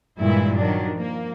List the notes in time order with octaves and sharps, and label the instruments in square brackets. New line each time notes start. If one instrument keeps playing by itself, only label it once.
[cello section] G2 A#2 E3 G#3 E4
D#3 F#3 D4
F3 A#3